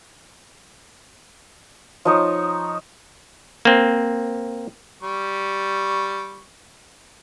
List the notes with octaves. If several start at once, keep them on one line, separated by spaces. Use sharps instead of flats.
F3 D#4 C#5
A#3 C4
G3 C#6